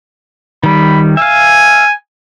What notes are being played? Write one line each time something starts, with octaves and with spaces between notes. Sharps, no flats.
D#3 G3 B5
E5 F5 G#5